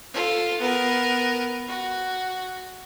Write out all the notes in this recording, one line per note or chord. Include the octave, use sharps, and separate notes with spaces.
F4 A4
B3 A#4
F#4